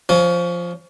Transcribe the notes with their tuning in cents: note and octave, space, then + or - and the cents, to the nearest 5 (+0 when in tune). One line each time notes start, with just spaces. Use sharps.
F3 +0 C#4 +25